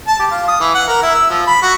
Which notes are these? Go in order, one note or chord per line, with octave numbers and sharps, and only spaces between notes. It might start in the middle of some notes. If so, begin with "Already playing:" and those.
A5
G4
F4
D#6
E3
F#5
A#4
E4
E6
F3
B5
F#4